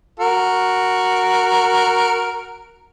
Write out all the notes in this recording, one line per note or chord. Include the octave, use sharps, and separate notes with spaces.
F#4 A#4